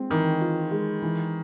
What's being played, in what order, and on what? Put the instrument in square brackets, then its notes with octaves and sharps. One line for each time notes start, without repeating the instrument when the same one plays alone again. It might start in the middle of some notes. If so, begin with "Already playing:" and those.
Already playing: [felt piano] G#3 C4
[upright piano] D#3 [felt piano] E3
[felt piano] F4
G#3
E3